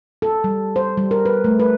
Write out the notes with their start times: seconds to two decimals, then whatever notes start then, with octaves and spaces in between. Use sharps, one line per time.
0.22 A4
0.44 G3
0.76 C5
0.97 G3
1.11 A#4
1.26 B4
1.44 A3
1.60 B4